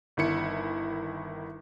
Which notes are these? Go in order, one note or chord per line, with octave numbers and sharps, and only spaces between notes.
G1 D#3 E4 C#7